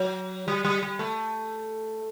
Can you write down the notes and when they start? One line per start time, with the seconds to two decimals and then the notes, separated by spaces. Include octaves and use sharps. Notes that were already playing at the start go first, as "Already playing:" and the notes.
Already playing: F#3
0.48 G3
0.65 G3
0.83 G3
0.99 A3